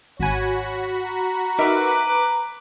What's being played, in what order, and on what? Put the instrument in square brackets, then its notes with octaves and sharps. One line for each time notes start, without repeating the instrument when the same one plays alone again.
[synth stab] G#1 G#5 [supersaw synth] F#4 B5 [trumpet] C#5
[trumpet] A#5
[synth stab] D#4 A#4 E5 [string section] B4 D6